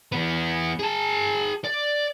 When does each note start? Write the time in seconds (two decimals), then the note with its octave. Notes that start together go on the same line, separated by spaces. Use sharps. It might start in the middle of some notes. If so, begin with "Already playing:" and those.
0.12 E3 B3
0.79 G#4 A5
1.65 D5